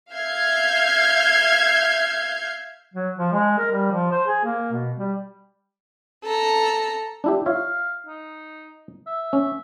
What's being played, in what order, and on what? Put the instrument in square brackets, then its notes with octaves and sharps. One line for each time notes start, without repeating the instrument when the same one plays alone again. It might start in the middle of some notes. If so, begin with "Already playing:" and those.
[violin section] E5 F5 F6 G6 G#6 C7
[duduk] F#3
F3
G#3
A#4
G3
F3
C5
G#4
A#3
B2
G3
[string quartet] A4 A#5
[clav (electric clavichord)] D4 E4 G4
[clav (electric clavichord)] F4 C#5 E5 [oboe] F5
[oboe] D#4
E5
[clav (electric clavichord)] C#4